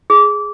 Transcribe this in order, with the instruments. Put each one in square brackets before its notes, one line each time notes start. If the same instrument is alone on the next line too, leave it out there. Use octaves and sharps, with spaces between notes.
[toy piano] G#4